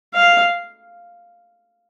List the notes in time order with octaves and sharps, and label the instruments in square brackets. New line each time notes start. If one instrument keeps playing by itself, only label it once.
[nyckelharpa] F5